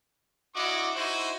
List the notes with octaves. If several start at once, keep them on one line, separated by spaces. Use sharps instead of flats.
D4 E4 F#4 D#5 C#6 D6
D#4 E4 F#4 C5